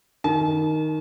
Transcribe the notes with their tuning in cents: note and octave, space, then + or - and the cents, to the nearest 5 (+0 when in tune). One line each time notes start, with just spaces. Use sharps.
D#3 +0 A5 -45